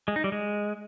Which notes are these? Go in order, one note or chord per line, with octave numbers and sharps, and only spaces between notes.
G#3
D#4
G3
G#3